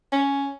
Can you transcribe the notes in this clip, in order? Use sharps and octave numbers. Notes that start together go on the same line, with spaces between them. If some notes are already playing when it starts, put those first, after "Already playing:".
C#4